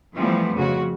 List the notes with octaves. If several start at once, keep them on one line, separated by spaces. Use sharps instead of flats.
E3 F3 G3 A3 B3 C4
F2 C#3 F#4